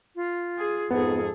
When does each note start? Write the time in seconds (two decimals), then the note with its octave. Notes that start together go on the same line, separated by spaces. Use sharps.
0.16 F4
0.58 G#4
0.91 F2 G#2 B3 G#4 A4